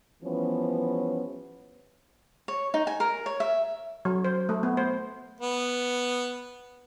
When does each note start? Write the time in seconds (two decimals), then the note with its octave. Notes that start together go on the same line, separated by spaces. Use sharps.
0.23 E3 F3 G3 B3 C#4
2.48 C#5
2.74 D#4
2.87 G#5
3.00 A#4
3.26 C#5
3.40 E5
4.05 F#3
4.25 C5
4.49 A3
4.63 B3
4.77 C5
5.41 B3